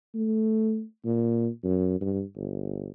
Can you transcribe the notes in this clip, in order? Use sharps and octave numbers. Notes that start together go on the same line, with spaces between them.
A3
A#2
F#2
G2
G1